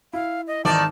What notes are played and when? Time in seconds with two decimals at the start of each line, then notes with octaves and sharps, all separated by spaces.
0.13 E4 F5
0.47 D#5
0.65 G#1 E2 D#3 D5 A5